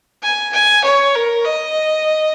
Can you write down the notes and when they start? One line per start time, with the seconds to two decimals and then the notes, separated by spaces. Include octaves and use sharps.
0.23 G#5
0.53 G#5
0.84 C#5
1.15 A#4
1.45 D#5